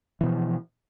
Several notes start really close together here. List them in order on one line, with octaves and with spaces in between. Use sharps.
E3 B2 F3